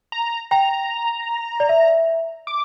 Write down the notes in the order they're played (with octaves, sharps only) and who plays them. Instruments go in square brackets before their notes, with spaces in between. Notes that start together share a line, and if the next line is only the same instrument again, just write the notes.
[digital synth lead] A#5
[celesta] G5 [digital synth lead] A#5
[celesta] D5
E5
[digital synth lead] D6